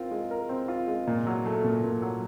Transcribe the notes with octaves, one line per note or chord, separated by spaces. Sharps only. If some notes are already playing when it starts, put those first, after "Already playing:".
Already playing: C4 F4 A#4
G#3
A#4
C4
F4
G#3
A#2
F#3
A3
A#2
A#2
F#3